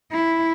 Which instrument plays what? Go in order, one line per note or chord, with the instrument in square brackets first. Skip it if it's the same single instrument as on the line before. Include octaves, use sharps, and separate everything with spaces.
[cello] E4